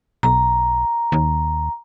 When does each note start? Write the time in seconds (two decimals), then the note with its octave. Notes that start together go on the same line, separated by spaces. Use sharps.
0.23 B1 A#5
1.12 D#2